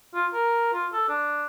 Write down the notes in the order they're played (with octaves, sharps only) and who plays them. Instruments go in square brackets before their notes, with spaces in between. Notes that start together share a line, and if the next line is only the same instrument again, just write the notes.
[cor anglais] F4
A#4
F4
A4
D4